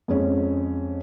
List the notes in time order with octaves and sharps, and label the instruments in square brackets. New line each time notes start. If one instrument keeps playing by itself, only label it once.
[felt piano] F2 G#3 C#4